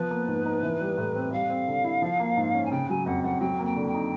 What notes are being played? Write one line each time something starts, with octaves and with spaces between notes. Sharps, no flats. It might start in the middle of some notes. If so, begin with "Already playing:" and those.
Already playing: F3 B3 B4
A#3
G#2
D#4
E3
G3
A2
C4
G3 F5
C4
D3
E4
F3
A#3
G#2
C#4
G#5
C#3 G5
F#3 G#5
F2 F#5
F2 F#5
F#3 G5
A#3
G5
D3
G5
D#4